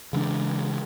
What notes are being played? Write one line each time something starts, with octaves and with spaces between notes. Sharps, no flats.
C#3 E3 G#3 D4